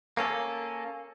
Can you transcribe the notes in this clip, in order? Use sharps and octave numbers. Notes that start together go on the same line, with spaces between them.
A#3 C#4 A4